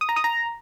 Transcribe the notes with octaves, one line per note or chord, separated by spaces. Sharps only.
D#6
A#5
D#6
A#5